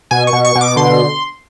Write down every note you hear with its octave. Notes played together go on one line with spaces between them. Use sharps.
B2 G#5
C#6
B2
C#6
B2
D6
D3 C6